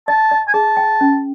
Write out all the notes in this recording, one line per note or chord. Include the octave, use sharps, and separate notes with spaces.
D#5 A5
D#5
G#5
G#4 A5
G5
C#4